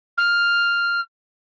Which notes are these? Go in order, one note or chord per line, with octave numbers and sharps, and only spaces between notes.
F6